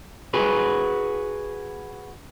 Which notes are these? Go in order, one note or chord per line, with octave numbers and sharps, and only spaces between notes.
F#4 G#4 B4